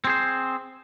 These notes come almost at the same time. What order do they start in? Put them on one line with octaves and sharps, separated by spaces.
C4 G#4 C5